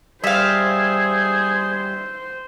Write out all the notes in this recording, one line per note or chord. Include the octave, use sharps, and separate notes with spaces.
G3 G#4 C5 E5 F5